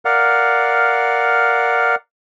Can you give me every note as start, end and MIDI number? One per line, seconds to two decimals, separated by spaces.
0.05 1.95 70
0.05 1.95 74
0.05 1.95 77
0.05 1.95 78